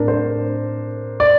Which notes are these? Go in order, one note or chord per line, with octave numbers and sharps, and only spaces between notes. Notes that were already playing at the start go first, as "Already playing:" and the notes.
Already playing: A2 A3 C4 D4 A#4
C5
D5